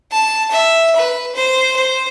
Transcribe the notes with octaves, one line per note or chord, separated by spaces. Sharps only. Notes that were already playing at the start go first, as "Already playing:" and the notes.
A5
E5
B4
C5
C5